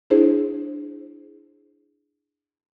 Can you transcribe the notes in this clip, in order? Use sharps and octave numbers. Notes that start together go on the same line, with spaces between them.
D4 E4 G#4 C5